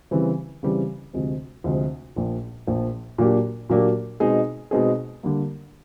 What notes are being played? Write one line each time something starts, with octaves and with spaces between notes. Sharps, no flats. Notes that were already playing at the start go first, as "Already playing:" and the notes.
C#3 E3 G3 C4
C#3 E3 G3 C4
D2 C3 F3 G#3 C4
D2 C3 F3 G#3 C4
A#1 A#2 F3
A#1 A#2 F3
A#2 F#3 A#3 D4 G4
A#2 F#3 A#3 D4 G4
B2 G#3 C4 D#4 G#4
B2 G#3 C4 D#4 G#4
D3 G3 A#3